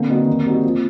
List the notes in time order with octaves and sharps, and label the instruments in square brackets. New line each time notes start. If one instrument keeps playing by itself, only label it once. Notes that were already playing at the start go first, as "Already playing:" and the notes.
Already playing: [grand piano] D3 [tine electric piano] A#3 C4
[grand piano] F#3 B3 D#4
D#3
G3 C4 D#4 F#4
F3